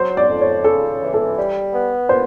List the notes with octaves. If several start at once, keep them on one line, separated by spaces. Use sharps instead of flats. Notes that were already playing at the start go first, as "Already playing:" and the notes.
Already playing: F#3 C5
D5
F2
C#5
C#3 A4
E3
A4
G3
B3
A#2 C5